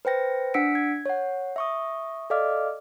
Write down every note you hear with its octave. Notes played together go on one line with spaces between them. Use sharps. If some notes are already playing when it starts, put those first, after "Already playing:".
B4 C5 G5 A#6
D4 F#5 E6 B6 C#7 D7
G#6
C#5 F#5
E5 C#6 D#6
A4 D5 D#5 F5 D6 F6